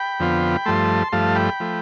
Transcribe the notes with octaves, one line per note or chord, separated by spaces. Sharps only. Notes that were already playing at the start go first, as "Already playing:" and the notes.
Already playing: G5 B5
F2 D3 F3 B3 F4
G2 F3 A3 A5 C6
G2 F3 A3 F5 A5
G5 B5
F3 A3